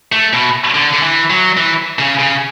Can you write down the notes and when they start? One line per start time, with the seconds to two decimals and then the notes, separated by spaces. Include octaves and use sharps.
0.12 A3
0.33 B2
0.75 D3
0.93 D3
1.03 E3
1.30 F#3
1.57 E3
1.99 C#3
2.19 C#3